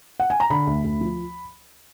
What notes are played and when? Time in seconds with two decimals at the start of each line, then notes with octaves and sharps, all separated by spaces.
0.20 F#5
0.30 G#5
0.40 A#5
0.50 D3 B5
0.67 D2
0.84 D2
1.01 F3